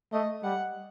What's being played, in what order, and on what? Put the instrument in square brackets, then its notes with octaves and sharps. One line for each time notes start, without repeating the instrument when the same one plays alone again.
[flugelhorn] A3 [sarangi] D#5
[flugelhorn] G3 [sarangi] F#5